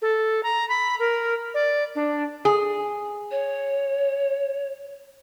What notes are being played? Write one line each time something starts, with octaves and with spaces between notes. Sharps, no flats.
A4
A#5
B5
A#4
D5
D4
G#4
C#5